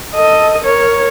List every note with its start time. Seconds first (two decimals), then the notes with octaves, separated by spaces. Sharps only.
0.14 A4 D#5
0.64 A#4 C#5